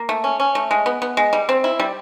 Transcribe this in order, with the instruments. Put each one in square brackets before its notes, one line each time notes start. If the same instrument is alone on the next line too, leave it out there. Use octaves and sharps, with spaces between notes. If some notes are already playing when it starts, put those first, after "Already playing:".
Already playing: [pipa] A#3
A3
C#4
C#4
A3
G#3
B3
B3
G#3
G3
C4
E4
G3